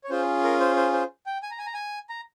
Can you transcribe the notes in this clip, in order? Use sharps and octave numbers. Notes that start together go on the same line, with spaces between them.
C#5
C#4 F4 G#4 C5
A#4
C5
C5
C5
G5
G#5
A#5
G#5
A#5
G#5
A#5